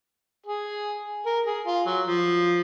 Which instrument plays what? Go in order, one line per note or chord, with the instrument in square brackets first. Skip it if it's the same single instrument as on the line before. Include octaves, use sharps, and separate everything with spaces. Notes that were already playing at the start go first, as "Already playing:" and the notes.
[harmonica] G#4
A#4
G#4
F4
F#3
F3